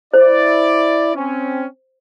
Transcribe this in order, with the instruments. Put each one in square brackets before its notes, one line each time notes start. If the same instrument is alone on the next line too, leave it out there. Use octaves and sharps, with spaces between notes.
[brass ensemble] E4 D5 [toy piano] C5
[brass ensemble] C4 C#4